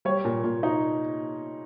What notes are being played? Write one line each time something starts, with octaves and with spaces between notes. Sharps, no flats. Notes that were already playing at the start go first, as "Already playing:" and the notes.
G3 C#5
A#2
A#2
D#4